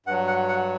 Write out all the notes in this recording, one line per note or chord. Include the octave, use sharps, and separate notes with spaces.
G2 F#3 F#5
F#5
F#5